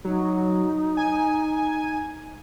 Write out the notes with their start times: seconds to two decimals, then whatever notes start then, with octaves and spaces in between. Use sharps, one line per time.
0.05 F#3 D#4
0.97 G#5